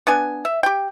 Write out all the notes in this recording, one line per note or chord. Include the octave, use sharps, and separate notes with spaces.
B3 D4 G#5
E5
G4 G5